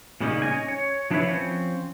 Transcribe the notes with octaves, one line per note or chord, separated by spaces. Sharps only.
A#2 C#3 G3 A#3 C#4 D#4
C#4 E4 D#5 G#5
C#5
F3 D4 E4 A4 B4 C#5
F3 C4 C#4